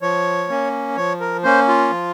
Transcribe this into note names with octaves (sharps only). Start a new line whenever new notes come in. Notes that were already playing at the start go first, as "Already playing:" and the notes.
F3 C#5
A#3 C#4
F3 C#5
A#4
A#3 C#4 C5
F4
F3